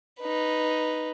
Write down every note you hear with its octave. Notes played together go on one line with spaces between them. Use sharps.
D#4 B4